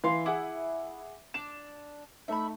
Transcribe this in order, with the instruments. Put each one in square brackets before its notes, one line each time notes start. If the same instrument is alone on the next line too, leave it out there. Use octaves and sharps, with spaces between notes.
[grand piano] E3 [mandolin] E5 F5 C6
[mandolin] E4 [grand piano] G#4 F#5 D6
[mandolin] D4 D6 [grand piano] E7
[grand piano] A3 D#4 [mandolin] E5 B5